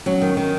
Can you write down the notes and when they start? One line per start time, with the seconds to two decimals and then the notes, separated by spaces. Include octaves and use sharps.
0.06 F#3 C#4
0.22 D#3
0.37 D#3